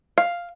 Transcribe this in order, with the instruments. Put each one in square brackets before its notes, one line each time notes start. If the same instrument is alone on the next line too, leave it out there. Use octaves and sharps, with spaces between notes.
[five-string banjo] F5